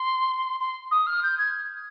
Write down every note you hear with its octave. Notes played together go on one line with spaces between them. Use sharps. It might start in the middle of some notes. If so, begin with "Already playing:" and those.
Already playing: C6
C6
D#6
F6
G6
G#6